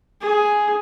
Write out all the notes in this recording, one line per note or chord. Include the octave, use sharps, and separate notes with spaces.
G#4